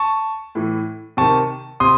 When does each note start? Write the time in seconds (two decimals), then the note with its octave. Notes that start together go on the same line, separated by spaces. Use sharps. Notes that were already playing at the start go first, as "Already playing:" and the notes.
Already playing: A5 C#6
0.55 A2 E3
1.17 C3 D#3 A5 C#6
1.80 C3 C6 D#6